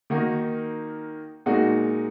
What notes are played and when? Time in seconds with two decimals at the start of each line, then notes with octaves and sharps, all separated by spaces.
0.10 D#3 A#3 D#4 F#4
1.46 A#2 G#3 D#4 F#4